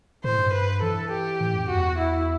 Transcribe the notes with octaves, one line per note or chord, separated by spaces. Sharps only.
A2 C5
G2
B4
E3 A4
G4
A2
F#2
E2 F#4
E4